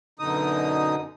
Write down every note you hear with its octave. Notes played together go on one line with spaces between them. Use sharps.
F#2 B2 D3 D#4 D#6